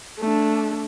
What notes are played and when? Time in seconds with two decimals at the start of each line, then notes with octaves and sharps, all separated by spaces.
0.20 A3 D4